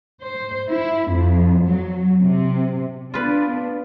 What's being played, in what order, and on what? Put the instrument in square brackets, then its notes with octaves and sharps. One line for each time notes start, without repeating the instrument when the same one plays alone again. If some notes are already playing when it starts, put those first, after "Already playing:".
[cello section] C5
E4
F2
F#3
C3
[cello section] B3 D4 [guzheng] F4 B4